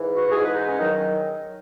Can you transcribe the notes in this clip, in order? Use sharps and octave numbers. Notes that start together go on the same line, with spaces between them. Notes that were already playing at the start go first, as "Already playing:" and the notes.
Already playing: G#2 E3
F#4
G#2 E3 G#4
B4
D#4
C#4
D#3 F#3 D#4